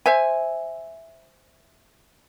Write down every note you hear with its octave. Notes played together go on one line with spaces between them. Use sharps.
C5 E5 G#5